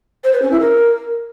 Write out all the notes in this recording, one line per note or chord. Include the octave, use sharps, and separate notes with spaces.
C5
B4
C#4
E4
A#4